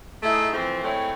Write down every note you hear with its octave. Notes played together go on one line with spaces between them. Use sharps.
A3 D#4 E4 G#4
E3 F3 A3 C4
G#3 A3 C4 E4 C#5